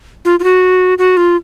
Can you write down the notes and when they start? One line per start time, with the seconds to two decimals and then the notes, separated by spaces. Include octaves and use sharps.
0.25 F4
0.40 F4
0.44 F#4
0.98 F#4
1.17 F4